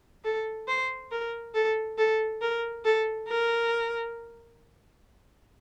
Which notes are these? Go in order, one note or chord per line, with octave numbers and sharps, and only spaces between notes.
A4
C5
A#4
A4
A4
A#4
A4
A#4